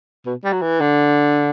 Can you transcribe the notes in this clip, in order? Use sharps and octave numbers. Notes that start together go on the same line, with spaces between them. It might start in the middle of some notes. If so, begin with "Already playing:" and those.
B2
G3
F#3
E3
D3